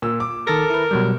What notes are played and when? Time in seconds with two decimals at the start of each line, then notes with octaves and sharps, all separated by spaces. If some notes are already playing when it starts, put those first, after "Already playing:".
0.02 A#2 E6
0.20 D6
0.47 D#3 A4 A#4 A6 A#6
0.70 E4 B4
0.91 B2 F#3 G3